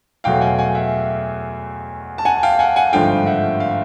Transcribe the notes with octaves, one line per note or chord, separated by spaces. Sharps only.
E2 B2 F#3 A3 F5 G5
F#5 G#5
F#5 G#5
E5 F#5
A5
F#5 G#5
F5 G5
F#5 G#5
F#5 G#5
G#1 G2 D3 F3 A3 F5 G5
E5 F#5
F5
E5